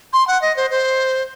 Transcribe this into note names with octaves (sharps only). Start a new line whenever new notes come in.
C6
F#5
D#5
C5
C5